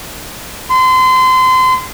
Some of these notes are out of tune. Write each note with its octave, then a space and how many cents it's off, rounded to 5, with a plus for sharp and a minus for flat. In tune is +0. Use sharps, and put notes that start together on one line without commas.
C6 -30